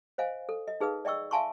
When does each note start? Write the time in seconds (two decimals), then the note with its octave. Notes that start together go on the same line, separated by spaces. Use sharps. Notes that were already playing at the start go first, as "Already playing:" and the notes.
0.18 C5 D#5 F5 G#5
0.49 A4
0.68 D#5
0.81 D#4 G#4 B4 F5 D#6
1.05 D5 D#5 G5 C#6 E6
1.31 E5 F5 G#5 A5 C6 C#6